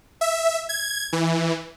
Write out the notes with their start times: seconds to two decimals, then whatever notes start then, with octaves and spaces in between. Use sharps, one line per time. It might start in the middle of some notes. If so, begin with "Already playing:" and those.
0.21 E5
0.69 G#6
1.13 E3